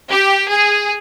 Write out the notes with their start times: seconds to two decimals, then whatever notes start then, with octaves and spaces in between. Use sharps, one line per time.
0.10 G4
0.49 G#4